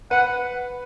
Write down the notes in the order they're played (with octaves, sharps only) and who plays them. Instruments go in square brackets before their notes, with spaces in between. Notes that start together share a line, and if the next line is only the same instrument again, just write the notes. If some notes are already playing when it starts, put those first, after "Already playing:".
[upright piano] B4 [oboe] F#5